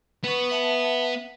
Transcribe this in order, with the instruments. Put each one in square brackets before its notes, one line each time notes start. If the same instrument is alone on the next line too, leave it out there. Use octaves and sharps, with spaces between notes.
[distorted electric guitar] B3 [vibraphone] B4 C#6
[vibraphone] E5 F#5 A5